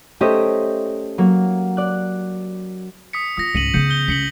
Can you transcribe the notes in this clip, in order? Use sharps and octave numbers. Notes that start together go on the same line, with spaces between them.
A3 C#4 G4 C5 D#5 E5
F#3 A#3
D5 F#6
D#6 B6 C#7
F4 D#6 A#6
C#2 G#2 C#7 D#7 F#7
C#3 B3 G6 C#7
G6 G7
C#2 B6 C#7 F#7